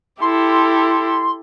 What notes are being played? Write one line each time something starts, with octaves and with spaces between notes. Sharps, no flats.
E4 G4 A4 C6